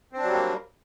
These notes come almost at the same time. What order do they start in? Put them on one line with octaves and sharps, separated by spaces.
C4 D4 F#3 G3 A#3